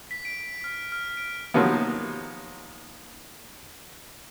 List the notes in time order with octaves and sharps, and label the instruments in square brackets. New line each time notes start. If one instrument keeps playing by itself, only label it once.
[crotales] B6
D7
F6
F6
D7
[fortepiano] C3 D#3 F3 F#3 A#3 B3